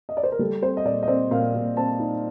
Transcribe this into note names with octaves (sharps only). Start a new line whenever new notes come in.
D#5
D5
C5
A#4
G3 A4
C4 C5
D#5
A#2 D5
D#5
C4 D5
A#2 F5
A#2
C4 A5
D#4